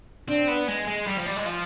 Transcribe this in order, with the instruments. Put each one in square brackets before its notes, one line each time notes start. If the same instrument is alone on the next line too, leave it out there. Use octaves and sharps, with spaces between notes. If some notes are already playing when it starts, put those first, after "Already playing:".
[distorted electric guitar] C4 [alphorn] D4
[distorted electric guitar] B3
G#3
G#3
G3
F3
G3
G#3
F3